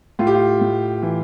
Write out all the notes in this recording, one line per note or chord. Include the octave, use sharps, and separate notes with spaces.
A2 F4
G4
F4
A2
E3